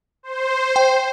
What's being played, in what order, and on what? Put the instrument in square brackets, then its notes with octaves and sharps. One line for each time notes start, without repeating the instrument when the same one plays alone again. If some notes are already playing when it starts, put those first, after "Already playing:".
[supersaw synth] C5
[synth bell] G5